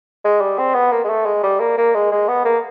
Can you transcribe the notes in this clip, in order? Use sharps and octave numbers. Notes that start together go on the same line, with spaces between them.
G#3
G3
C4
B3
A#3
G#3
A3
G#3
G3
A#3
A#3
G#3
G#3
B3
A#3